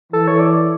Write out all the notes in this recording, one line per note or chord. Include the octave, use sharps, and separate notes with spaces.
E3 A4
C#5
D5